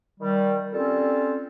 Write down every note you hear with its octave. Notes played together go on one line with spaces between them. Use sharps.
D#3 G3
G3 C4 C#4 F4 A4